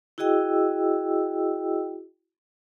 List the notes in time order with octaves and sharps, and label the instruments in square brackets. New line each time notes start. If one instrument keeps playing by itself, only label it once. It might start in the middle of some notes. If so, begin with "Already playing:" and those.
[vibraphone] E4 F#4 G#4 D#5 G5 E6